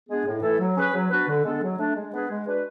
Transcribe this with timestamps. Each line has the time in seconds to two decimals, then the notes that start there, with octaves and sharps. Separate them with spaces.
0.08 G#3 B3 D4 G#4
0.26 A2
0.42 E3 A3 E4 A4
0.59 F#3
0.76 C#4 G#4 B4
0.93 F#3
1.10 B3 D4 F#4 B4
1.28 D3
1.44 G#3 B3 D4 A4
1.62 F#3
1.78 A3 D4
1.95 G#3
2.13 B3 D4 G#4 B4
2.29 G#3
2.47 D4 F#4 B4